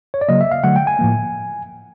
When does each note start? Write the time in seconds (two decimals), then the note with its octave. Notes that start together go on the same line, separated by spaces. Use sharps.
0.14 C#5
0.21 D5
0.29 C#3 F#3 A#3 D#5
0.41 E5
0.51 F5
0.64 D3 F#3 A3 F#5
0.76 G5
0.87 G#5
0.99 A2 F3 A#3